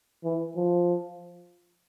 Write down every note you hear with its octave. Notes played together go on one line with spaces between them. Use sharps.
E3
F3